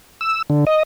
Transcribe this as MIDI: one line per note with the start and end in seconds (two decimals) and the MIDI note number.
0.21 0.42 88
0.50 0.65 50
0.67 0.83 75